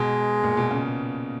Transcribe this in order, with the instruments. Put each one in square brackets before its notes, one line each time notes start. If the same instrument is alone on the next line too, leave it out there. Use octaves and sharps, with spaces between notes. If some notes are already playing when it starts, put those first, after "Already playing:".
Already playing: [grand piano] B2 [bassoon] G#3
[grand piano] A#2
B2
C#3